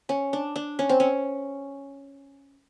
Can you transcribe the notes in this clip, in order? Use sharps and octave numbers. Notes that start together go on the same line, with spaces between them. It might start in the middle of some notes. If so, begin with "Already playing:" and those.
C#4
D4
D4
C#4
C4
C#4